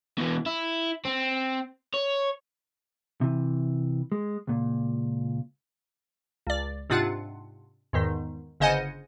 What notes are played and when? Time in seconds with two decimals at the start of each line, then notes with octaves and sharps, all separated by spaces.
0.18 B2 E3
0.46 E4
1.05 C4
1.94 C#5
3.21 C3 E3
4.12 G#3
4.47 C#2 A#2
6.47 C#2 D5
6.90 G#2 C3 D4 F4 F#5
7.93 E2 G#2 D#3
8.60 G1 C#3 C5 D#5 F#5 G#5